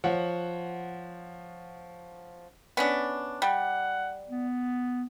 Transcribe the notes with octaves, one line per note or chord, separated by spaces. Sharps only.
F3 C#5 F#5
B3 C#4 D4
G3 F#5
B3